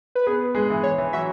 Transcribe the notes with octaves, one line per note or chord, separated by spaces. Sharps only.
B4
B3 G#4 B4
G#3 G#4
E3 E4
C#5
E3 E4
F#3 F#4 E5